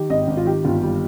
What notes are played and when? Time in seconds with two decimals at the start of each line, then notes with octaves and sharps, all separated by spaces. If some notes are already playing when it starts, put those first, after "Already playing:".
Already playing: D#3 G4
0.10 G#1 D#5
0.28 G#1
0.37 F4
0.46 D#3 G4
0.64 G1 F4
0.82 G3